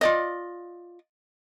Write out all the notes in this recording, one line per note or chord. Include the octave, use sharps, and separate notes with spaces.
F4 D5 D#5